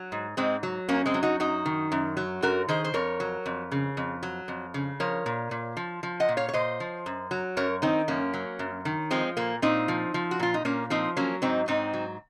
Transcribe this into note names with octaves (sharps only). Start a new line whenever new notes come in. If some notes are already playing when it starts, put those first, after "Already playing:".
Already playing: F#3
G#2
G#2 G#3 C4
F#3
F#2 A#3 C#4
G#3 C4
F#3
D#4 F#4
F#2 D#4 F#4
D#3
F#2
F#3
F#2 F#4 A#4
D#3 G#4 C5
C5
F2 A#4 C#5
F#3
F2
C#3
F2
F#3
F2
C#3
F3 A#4 C#5
A#2
A#2
F3
F3
D#5 F#5
A#2
C#5 F5
C#5
A#2 C5 D#5
F3
F#2
F#3
F#2 A#4 C#5
D#3 C4 D#4
F#2 A#3 C#4
F#3
F#2
D#3
F3 G#3 C4
A#2 A#3
A#2 C4 D#4
F3
F3
F#4
A#2 F4
D#4
A#2 A#3 C#4
F3 C4 D#4
F#3 A#3 C#4
G#2 C4 D#4
G#2 C4 D#4
F#3